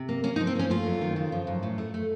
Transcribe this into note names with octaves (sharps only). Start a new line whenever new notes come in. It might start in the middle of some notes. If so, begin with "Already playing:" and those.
Already playing: C3
A#3
A#3 C#4
D#4
F3
C4
A#3 C#4
A3 F4
F#2
D#3
C#3
F3
F#2
A2
A3
A3